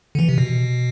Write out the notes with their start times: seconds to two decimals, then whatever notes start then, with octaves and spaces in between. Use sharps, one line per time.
0.15 D3
0.19 E3
0.29 C3
0.38 B2